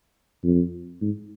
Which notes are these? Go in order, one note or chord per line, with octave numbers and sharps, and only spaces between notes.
F2
G#2